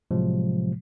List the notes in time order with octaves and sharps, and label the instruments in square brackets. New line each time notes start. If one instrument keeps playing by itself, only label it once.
[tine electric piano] A2 C3 F3 F#3 G#3